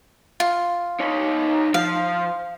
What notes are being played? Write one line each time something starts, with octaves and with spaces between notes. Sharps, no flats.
F4
D#4 C#5
F3 F5